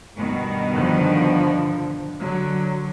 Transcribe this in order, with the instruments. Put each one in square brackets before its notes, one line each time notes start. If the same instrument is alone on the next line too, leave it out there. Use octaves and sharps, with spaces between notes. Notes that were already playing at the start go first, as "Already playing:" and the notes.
[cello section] G2 B2 D#3
[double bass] D3 F3
[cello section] D3 [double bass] F#3